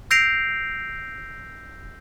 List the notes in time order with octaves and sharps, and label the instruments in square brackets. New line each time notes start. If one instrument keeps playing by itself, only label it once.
[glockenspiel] E6 G6 A#6 C7 D7 F7